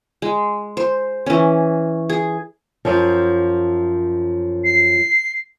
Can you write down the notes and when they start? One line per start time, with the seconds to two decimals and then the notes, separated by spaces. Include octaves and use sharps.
0.22 G#3
0.77 C5
1.26 E3 C#4
2.09 G#4
2.85 F#2 F3
4.64 C7